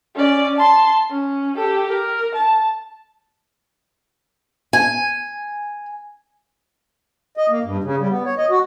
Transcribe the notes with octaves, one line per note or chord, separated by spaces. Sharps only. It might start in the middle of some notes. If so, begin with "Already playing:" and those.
C#4 D5
A5 C6
C#4
G4 A4
A#4
A5
G#5
D#5
A#3
G2
C#3
G3
B3
C#5
D#5
F#4